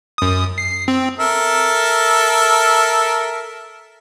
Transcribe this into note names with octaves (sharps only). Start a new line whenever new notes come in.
F#2 D#6
C7
C4
A4 A#4 E5